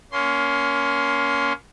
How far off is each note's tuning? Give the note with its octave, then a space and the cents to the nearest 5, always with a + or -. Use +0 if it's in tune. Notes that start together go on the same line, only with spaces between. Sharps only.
A#3 +20 C#4 +25 C6 +0